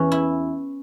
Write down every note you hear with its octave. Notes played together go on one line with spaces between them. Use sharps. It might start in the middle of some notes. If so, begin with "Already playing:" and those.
Already playing: E2 E3 C#4
E4